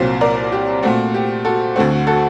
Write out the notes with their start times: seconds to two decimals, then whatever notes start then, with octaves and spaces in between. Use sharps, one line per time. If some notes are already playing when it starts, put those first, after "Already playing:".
Already playing: C2 A#2 F#3 C4
0.21 A#4 D5
0.52 G4
0.83 A#2 A3 C4 F#4
1.14 G4
1.45 F#4 A4
1.76 D2 D3 A3 C4 F#4
1.90 F#4
2.07 F#4 A4